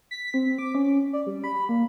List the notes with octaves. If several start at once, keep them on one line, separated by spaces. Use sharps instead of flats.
B6
C4
D6
C#4
D5
G3
B5
A#3